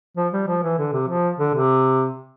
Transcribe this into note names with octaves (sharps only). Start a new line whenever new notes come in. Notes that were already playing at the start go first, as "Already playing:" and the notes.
F3
G3
F3
E3
D3
C3
F3
D3
C3